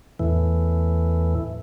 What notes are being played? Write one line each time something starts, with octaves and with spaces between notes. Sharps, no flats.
E2 A2 E3